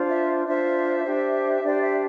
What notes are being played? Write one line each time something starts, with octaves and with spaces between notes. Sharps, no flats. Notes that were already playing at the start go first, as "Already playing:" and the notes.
Already playing: D4 F4 C5
E5
D4 F4 C5 E5
D4 G4 C5
D4 G4 C5 D5
E5